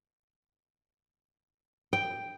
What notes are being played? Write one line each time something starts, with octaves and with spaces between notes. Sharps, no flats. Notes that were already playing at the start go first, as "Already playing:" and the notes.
G5